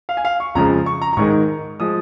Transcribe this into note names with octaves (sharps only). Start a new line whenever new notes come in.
F5
G#5
F5
C#6
F2 C#3 F3 G#3 A#5
C#6
A#5
A#5
G#2 D#3 G#3 C#6
F3 G#3 D#6